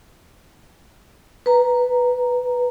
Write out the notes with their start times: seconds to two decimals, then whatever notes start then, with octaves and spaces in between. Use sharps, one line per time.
1.46 B4 A#5